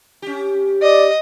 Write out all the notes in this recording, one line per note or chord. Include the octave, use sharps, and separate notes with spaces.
C#4 G4
D5 D#5